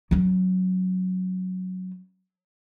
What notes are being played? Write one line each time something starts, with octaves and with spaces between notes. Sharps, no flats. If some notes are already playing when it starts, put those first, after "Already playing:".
F#3 C#4